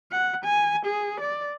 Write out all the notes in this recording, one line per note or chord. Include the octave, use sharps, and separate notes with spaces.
F#5
G#5
G#4
D5